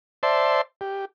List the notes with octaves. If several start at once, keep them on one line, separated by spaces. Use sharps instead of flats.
C5 D5 E5 A5 C6
G4